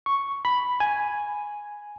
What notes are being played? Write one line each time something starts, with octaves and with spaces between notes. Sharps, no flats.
C#6
B5
G#5